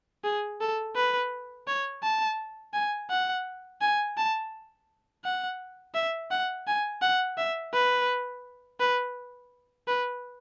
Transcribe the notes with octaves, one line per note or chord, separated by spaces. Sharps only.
G#4
A4
B4
C#5
A5
G#5
F#5
G#5
A5
F#5
E5
F#5
G#5
F#5
E5
B4
B4
B4